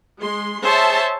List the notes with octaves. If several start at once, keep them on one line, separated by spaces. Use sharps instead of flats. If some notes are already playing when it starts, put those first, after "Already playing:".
G#3 C6
G#4 C5 C#5 E5 A5